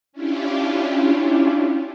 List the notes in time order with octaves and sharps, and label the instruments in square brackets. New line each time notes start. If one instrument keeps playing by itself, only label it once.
[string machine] C#4 D4 E4 F4 G4